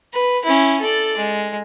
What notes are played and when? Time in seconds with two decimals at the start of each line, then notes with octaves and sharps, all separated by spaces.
0.14 B4
0.45 C#4 E4
0.81 A4 D5
1.17 G#3